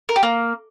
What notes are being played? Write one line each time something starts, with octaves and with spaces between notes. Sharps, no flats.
A#4
G4
A#3